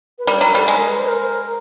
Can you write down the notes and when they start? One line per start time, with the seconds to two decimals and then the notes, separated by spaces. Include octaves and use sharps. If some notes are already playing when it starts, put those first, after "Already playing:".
0.19 B4
0.26 G3 A#4
0.37 C#5
0.41 F#3
0.48 A#4
0.55 G3 A4
0.68 G#3
0.78 A#4
0.88 B4
0.98 C5
1.08 A#4